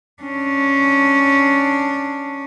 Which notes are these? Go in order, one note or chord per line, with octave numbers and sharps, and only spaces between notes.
C#4 D4